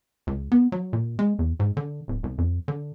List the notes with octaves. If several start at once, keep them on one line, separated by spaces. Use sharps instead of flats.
C#2
B3
F#3
A#2
G#3
E2
G#2
D3
D1
C2
F2
D3